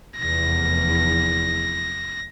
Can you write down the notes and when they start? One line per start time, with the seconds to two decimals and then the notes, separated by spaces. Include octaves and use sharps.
0.17 F1 E2 A#6